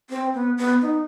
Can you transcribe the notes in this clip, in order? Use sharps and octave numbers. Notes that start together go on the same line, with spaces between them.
C4
B3
B3
D#4